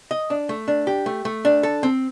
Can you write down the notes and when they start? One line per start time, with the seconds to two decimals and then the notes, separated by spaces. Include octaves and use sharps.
0.11 D#5
0.30 D4
0.49 A3
0.68 D4
0.87 G4
1.06 A3
1.25 A3
1.45 D4
1.63 A4
1.83 C4